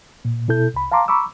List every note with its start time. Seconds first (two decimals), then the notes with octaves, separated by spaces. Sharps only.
0.25 A#2
0.48 B2 E4 A4 G6
0.74 C2 B5
0.92 F5 A5 A#5 C6 D6
1.08 A#5 B5 C#6 D6 E6